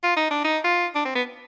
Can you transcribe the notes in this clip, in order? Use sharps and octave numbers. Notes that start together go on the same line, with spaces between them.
F4
D#4
D4
D#4
F4
D4
C4
B3